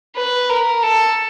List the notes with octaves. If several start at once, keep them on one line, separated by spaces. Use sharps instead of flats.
B4
A#4
A4